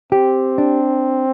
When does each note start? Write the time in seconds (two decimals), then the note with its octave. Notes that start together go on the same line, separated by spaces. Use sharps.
0.12 C4 G4
0.58 D4